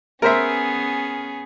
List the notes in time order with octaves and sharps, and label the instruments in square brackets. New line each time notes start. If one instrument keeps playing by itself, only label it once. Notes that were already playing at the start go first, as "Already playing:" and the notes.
[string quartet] B3 C#4 G#4 [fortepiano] A#4 C5 E5